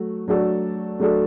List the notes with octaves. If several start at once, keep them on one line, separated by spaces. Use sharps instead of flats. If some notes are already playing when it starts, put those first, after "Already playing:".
Already playing: F#3 A3 F#4
F#3 A3 D4 F#4 A4
F#3 A3 D4 F#4 A4